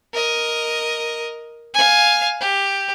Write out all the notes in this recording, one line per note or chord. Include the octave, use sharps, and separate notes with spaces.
A#4 D#5
F5 G#5
G4